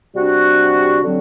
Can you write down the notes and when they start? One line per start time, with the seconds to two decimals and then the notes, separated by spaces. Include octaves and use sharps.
0.15 C3 G3 D4 F#4
1.04 D3 F#3 C4